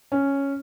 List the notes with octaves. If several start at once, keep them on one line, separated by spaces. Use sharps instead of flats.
C#4